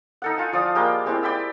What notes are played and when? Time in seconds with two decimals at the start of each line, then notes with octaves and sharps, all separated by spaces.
0.22 D#4 A4 F#5
0.38 F4 G#5
0.53 F3 D5 A5 D#6
0.75 G3 G#3 A#3 G5
1.06 G#3 C4 E4 G4
1.23 D5 G5 B5 E6